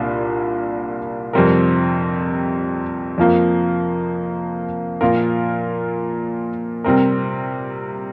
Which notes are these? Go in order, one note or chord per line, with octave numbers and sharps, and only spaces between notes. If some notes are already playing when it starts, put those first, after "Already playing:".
Already playing: C2 A#2 A#3 D4
F2 C3 G3 C4 A#4
F2 F3 A#3
A#2 F3 A#3 F4 A#4
C3 G3 C4 A#4